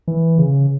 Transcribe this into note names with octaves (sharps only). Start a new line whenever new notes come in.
E3
C#3